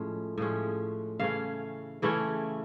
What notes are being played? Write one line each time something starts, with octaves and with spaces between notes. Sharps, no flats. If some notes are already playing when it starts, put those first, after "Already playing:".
Already playing: A2 F3 G#3 C#4
A2 F3 G#3 C#4
C#3 E3 A3 C#4 F5
C#3 E3 A3 C#4